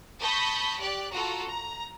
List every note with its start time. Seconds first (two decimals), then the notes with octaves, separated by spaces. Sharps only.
0.20 A5 B5 C#6 D#6 G6 A#6
0.79 G4 D5 F#6
1.12 F4 F#4 A4 A#5
1.46 A#5